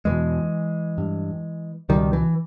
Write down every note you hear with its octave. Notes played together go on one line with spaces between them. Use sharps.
E2 B2 E3 G#3
G2
C#2 B2 D#3 G3
E3